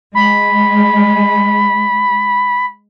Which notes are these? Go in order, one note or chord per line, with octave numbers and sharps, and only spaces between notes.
G#3 B5